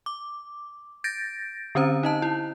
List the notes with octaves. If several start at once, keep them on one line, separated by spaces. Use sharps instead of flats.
D6
G6 A6 A#6 D7
D3 C4 C#4 C5 A#5
D#4 D#5 A5
E4